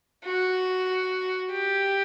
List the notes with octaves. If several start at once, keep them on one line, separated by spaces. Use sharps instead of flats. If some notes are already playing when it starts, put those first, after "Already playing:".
F#4
G4